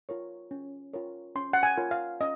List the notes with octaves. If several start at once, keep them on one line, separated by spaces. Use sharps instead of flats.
F4 A#4 C#5
C#4
F4 A#4 C#5
C#4 C6
F#5
G#5
F4 A#4 C#5
F5
C#4 D#5